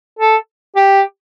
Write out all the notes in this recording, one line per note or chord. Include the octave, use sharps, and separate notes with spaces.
A4
G4